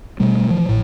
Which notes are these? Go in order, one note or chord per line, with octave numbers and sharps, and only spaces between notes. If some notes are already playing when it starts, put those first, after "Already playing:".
B2 G3 A3
E3 F3
A1 A2